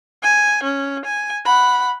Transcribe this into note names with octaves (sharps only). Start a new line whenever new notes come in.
G#5
C#4
G#5
F#5 B5